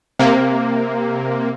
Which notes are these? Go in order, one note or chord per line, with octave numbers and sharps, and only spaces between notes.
C3 A#3